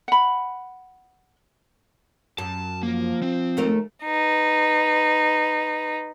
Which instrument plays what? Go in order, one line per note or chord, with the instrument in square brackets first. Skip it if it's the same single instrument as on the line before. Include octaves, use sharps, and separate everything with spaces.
[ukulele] F#5 B5
[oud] F#2 [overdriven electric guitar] A5
[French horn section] F3 [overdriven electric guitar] A#3
[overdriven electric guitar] C4
[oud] D#2 A3 A#4
[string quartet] D#4 B4